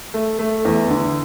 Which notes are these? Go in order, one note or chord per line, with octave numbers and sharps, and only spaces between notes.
A3
A3
E2
D3